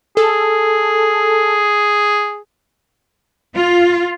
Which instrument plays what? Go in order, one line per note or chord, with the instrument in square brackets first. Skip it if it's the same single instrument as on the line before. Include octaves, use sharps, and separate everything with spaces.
[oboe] G#4 [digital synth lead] A4
[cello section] F4